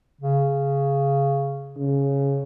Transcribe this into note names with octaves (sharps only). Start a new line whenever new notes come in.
C#3
C#3